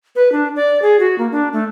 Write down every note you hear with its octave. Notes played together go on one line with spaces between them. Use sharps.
B4
D4
D5
G#4
F#4
A#3
D4
A3